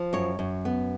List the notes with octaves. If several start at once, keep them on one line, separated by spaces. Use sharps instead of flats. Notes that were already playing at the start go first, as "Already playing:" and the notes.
Already playing: F3
F#2 C#5
F#2
B3